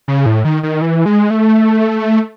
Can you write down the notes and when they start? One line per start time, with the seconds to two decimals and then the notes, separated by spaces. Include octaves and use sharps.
0.08 C#3
0.26 A2
0.45 D#3
0.63 D#3
0.81 E3
1.06 G#3
1.30 A3